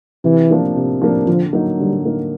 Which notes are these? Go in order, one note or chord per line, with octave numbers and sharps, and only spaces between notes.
C3 E3
F3 A#3 D4
C3
F3 A#3 D4
D3 F3
F#3 A#3 D#4
D3 G3
F#3 A#3 D#4